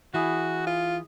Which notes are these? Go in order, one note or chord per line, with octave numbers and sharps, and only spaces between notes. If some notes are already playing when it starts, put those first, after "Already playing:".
E3 E4 F#4 G#4
F4